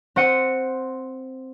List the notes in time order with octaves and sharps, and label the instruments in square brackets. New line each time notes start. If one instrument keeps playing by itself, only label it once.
[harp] C4 C5 F#5 C#7 D#7